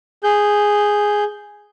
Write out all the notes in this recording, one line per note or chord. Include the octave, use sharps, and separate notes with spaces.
G#4 G6